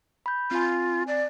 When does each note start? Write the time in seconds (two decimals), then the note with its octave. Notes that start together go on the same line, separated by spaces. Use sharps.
0.26 B5 G6
0.51 C4 F4 G#5
1.08 D5